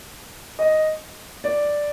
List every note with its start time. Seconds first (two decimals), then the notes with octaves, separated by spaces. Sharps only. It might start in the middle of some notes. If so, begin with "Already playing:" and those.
0.59 D#5
1.44 D5